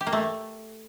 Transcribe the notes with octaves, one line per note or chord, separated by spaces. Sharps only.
G4
A#3
A3